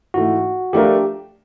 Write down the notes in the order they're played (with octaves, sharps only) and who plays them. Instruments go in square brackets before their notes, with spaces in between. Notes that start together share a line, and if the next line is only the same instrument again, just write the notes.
[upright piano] G#2 E3 A3 [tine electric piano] F#4
[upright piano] F3 A3 D4 F4 A#4 [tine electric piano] G4